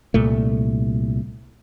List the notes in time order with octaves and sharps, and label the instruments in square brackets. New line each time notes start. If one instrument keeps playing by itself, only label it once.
[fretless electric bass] C2 A#2 A3